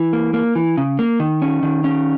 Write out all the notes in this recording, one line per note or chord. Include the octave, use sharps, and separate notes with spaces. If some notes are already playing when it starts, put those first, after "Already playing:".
Already playing: E3
A#3
A#3
E3
C#3
A#3
D#3
C#4
D#3
C#4